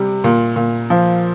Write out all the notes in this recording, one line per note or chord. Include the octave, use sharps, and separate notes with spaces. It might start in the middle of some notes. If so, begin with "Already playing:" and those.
Already playing: C3 G3
A#2
A#2
F3